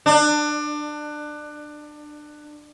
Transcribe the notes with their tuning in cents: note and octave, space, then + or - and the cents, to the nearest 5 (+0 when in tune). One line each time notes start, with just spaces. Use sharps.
D4 +25